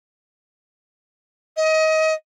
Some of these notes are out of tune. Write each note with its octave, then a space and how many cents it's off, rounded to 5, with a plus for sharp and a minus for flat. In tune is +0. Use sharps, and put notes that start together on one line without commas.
D#5 +25